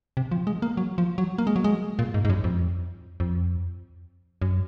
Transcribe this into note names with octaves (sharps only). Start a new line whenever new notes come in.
C3
F3
G#3
A#3
F#3
F3
F#3
A#3
G#3
F#3
G#3
A#2
G#2
G#2
F#2
F2
F2
F#2